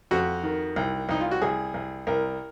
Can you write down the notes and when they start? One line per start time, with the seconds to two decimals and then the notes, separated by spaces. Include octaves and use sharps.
0.11 F2 F#4
0.43 D#3
0.76 C2
1.09 C2 D#4
1.21 F4
1.31 F#4
1.42 C2 G#4
1.74 C2
2.07 C2 A#4